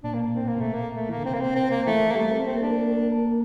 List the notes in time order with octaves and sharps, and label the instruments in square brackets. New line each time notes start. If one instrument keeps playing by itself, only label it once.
[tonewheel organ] A#2 [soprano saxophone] D4
[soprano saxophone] A#3
C4
A#3
[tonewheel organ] C3
[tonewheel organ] A#2 [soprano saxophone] A3
[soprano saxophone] A#3
A3
[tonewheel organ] E3 [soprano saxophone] A#3
[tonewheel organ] D3
[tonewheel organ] C3 [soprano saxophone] C4
[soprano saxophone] A#3
C4
C4
A#3
[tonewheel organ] E3 [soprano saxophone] A3
[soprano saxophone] A#3
[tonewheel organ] G3 [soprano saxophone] A3
[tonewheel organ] C4
[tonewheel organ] A#3 [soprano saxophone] C4
[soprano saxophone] D4